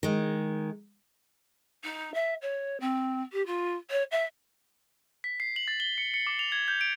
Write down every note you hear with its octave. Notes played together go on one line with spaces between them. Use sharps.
D#3 G#3
D#4
E5
C#5
C4
G4
F4
C#5
E5
B6
C7
F#7
A6
G7
C#7
C#7
D6
F7
G#6
G6
D7